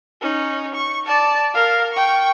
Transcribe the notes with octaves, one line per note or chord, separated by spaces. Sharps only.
C#4 D#4
C#6
D5 A5
A#4 F5
G5 C#6